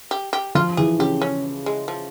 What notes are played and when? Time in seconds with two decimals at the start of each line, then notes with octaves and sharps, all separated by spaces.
0.11 G4
0.33 G4
0.55 F3 F4
0.77 E3 G#4
0.99 C#3 G4
1.22 C#4
1.66 G#3
1.88 F3